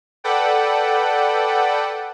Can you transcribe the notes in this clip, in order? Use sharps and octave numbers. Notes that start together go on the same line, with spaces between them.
A4 B4 D5 F#5 G5